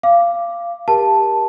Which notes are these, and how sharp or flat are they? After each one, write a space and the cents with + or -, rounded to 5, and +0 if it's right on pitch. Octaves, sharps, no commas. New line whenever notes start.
F5 -20 D6 +0
G4 +20 A#4 +30 A5 +0